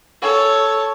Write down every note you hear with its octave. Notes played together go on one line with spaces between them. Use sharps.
A4 C#5